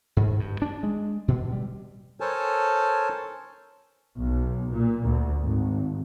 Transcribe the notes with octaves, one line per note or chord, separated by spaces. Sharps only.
G#2
G2
D4
G#3
B2
G3
A4 A#4 C5 C#5 G#5 A5
B1
A#2
D2
G#1